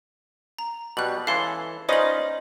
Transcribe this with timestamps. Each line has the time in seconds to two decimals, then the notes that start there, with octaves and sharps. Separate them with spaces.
0.59 A#5
0.97 B2 G3 F#6 F#7
1.27 E3 G#3 C#4 A4 F5 C6
1.89 C#4 D#4 F4 B4 C5 D5 D#5 F#7